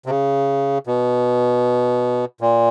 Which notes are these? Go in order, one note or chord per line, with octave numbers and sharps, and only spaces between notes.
C3
C#3
B2
A#2